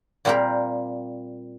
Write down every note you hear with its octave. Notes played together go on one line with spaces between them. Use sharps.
A#2 G3 C4 G4 A#4